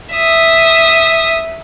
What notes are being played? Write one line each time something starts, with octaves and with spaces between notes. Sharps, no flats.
E5 D#6